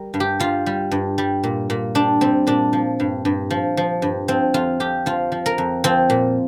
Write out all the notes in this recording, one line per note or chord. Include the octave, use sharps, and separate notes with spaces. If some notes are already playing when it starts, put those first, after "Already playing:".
Already playing: G3 A#4
G2
G4
G3 F4
G3
G2
G3
A#2
A#2
G3 D4
G3 C4
A#2 D4
F3
G2
G2
F3
F3
G2
F3 C4
F2 F4
F2 G4
F3 F4
F3
A#4
F2
F3 C4
A#2